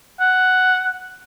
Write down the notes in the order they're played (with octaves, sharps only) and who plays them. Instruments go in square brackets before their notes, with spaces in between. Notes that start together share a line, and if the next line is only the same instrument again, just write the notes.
[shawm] F#5